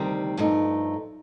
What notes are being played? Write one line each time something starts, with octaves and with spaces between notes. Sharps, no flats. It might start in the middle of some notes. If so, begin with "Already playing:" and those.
Already playing: D2 C3 D#3 G3 C4
G2 F3 A3 D#4